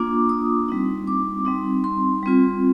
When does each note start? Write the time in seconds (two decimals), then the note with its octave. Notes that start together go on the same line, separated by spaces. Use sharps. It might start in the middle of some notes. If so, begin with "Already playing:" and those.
Already playing: A#3 D4 F4 D6
0.29 D#6
0.69 G3 C4 D#4
1.07 D6
1.45 G3 C4 D#4
1.84 C6
2.23 G3 C4 F4